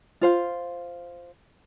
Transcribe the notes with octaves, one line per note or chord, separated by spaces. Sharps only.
F4 C5 F5